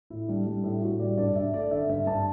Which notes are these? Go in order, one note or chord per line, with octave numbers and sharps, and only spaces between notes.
A2 E4
G3 D4
G3 D4
A2 E4
A2 F#4
G3 D5
G2 D5
G2 E5
A3 D5
D3 E5
G2 E5
G2 A5